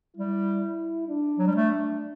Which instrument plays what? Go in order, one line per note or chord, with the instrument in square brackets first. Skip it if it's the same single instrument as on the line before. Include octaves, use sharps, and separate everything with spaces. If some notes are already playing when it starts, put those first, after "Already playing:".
[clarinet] G3 [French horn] E4
[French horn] D4
[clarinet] F#3
G3
A3